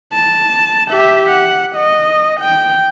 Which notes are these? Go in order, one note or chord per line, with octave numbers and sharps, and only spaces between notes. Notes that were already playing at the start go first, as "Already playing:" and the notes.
A5
G4 E5
F#5
D#5
G5